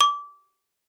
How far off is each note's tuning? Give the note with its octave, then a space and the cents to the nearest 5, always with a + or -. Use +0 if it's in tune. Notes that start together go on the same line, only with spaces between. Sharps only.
D6 -25